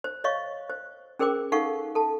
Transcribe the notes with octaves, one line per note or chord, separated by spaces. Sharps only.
C5
C#5 D#5 F5 C#6
C5
C#4 G#4 A#4 C5 G5 D6
D#4 A4 F5 F#5 C#6
A4 A5